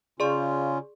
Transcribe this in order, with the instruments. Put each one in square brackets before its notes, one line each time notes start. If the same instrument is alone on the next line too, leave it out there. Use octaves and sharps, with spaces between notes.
[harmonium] C#3 C#4 F4 [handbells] G#4 D5 C6